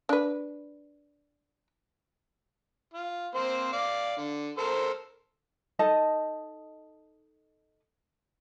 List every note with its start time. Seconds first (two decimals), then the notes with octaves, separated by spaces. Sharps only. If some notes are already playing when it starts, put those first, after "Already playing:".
0.09 D4 B4
2.93 F4
3.34 A#3 C4 C5
3.73 D5 F5 D6
4.17 D3
4.58 A4 A#4 C5
5.79 D#4 A4 D#5 A5